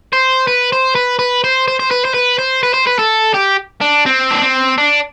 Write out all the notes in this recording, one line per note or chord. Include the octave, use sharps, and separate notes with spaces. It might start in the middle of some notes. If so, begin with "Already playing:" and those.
C5
B4
C5
B4
B4
C5
C5
C5
B4
C5
B4
C5
B4
C5
B4
A4
G4
D4
C4
D4
C4
D4